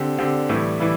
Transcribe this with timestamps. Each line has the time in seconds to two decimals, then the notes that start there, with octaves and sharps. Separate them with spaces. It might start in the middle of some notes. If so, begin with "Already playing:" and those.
Already playing: D3 C4 G4
0.18 D3 C4 G4
0.49 A2 E3 G3 E4
0.80 E3 G3 E4